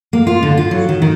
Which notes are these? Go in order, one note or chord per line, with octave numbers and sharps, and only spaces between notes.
A#3
F4
D3
F4
F#3
D#3
D#3